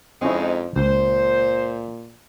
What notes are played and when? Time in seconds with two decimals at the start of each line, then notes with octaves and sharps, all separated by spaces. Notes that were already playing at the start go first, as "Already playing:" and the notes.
0.22 F2 F3 G#3 C4 C#4 D#4 E4
0.76 C#2 A#2 C5